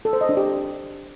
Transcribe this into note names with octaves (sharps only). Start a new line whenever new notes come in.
A4
C5
D#5
D4
G4